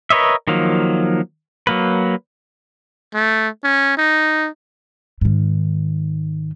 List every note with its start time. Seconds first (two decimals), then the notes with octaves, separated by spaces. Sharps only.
0.10 A#4 B4 C#5 D#5 E5
0.47 D#3 F3 F#3 A#3
1.67 F#3 A#3 B4
3.14 A3
3.64 C#4
3.97 D#4
5.21 G#2 D#3